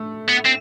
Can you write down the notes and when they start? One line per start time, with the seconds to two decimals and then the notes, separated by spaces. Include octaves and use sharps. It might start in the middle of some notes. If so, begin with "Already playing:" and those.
Already playing: A3
0.29 B3
0.45 C4